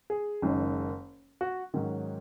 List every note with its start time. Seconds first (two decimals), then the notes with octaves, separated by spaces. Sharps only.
0.10 G#4
0.42 F#1 F#2 D#3 G#3 D#4
1.41 F#4
1.74 G#2 D#3 F#3 C#4